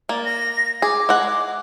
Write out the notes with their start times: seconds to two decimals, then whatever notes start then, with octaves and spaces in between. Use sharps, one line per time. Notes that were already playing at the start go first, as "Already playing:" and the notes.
0.09 A#3 D5
0.25 A#6
0.82 G#4 D6
1.09 G#3 F#5